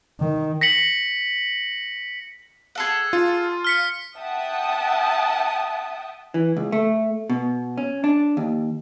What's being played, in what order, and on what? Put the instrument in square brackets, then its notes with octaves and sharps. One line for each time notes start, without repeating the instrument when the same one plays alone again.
[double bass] D#3
[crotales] A#6 B6 C#7 F#7
[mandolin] G#4 A4 F#5
[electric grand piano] F4
[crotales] F6 B6 C#7
[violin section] E5 F#5 G5 A5 D#6
[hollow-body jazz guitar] E3
C#2
A3
B2
C#4
D4
D#2